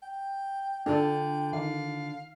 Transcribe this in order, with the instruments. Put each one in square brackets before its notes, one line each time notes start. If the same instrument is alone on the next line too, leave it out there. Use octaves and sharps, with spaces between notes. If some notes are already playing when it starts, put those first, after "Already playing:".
[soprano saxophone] G5
[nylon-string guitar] D3 F4 [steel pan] D4 A4 [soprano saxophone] G5
[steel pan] D#3 [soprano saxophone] F5